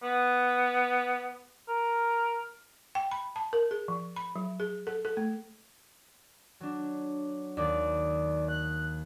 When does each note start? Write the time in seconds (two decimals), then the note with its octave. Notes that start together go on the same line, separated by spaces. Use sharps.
0.03 B3
1.68 A#4
2.95 G5
3.11 B5
3.36 A5
3.53 A#4
3.71 G#4
3.88 F3
4.16 B5
4.36 F#3
4.60 G#4
4.87 A4
5.05 A4
5.17 A3
6.60 F#3 D4
7.57 D#2 D5
8.48 F#6